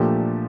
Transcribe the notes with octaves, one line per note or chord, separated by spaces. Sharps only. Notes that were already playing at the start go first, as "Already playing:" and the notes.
Already playing: A#2 F3 A3 D4 G4